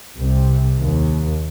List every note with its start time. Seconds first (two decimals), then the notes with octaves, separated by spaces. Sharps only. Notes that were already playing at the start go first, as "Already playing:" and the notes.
0.17 C2 C3
0.79 D#2